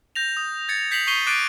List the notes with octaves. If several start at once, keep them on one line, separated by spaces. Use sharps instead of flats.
G6 A#6 F7
D#6
G#6 A6 C#7
G6 B6 C7 F7 F#7
C#6 B6 C7 D#7 G7
D6 F#6 A6 C7 D7 D#7